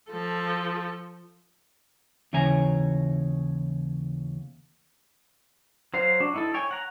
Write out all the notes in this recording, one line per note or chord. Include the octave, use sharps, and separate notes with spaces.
F3 A4
D#2 C#3 E3 C#5 G#5 A#5
F#3 C5 F5
D4 F#4
D#4 E4 A4
C#5 G5 G#5
F#5 A#5